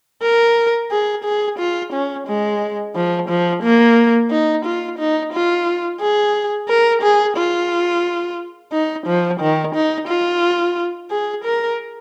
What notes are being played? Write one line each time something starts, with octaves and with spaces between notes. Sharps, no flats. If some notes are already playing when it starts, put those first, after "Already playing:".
A#4
G#4
G#4
F4
C#4
G#3
F3
F3
A#3
D#4
F4
D#4
F4
G#4
A#4
G#4
F4
D#4
F3
D#3
D#4
F4
G#4
A#4